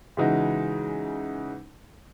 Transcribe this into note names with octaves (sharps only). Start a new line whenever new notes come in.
C#3 E3 G#3 D#4 F#4